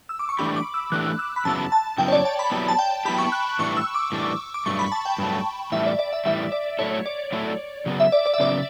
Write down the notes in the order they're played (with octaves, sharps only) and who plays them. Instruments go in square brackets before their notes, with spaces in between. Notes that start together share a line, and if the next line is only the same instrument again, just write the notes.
[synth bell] E6
D6
C#6
[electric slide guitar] E3 A3 D4 G4 [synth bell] B5
[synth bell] D6
E6
[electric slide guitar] E3 A3 D4 G4 [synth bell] F#6
[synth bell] E6
B5
[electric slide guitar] F#2 C#3 F#3 B3 E4 [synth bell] A5
[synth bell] A5
[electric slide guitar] F#2 C#3 F#3 B3 E4 [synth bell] G5
[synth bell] C#5
D5
A5
B5
[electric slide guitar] F#3 B3 E4 G4
[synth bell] A5
G5
[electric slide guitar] F#3 B3 E4 G4 [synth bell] B5
[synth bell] C#6
F#6
[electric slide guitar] A2 E3 G3 D4 [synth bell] C#6
[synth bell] E6
D6
[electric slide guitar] A2 E3 G3 D4
[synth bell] D6
[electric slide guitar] G2 F#3 A3 [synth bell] C#6
[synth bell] B5
A5
G5
[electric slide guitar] G2 F#3 A3
[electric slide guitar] A2 E3 G3 [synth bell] E5
[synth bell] D5
D5
E5
[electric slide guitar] A2 E3 G3 [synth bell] E5
[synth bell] D5
[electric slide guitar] F#3 A3 E4 A4 [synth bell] C#5
[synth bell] D5
[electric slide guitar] F#3 A3 E4 A4
C#3 F#3 B3
[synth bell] E5
D5
D5
E5
[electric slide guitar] C#3 F#3 B3 [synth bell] D5